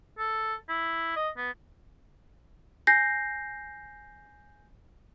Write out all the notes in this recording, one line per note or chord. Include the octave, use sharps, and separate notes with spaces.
A4
E4
D#5
B3
G#5 G6 A#6 C7